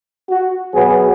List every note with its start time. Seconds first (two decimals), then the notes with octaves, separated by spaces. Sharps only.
0.30 F#4
0.75 B2 F#3 B3 G#4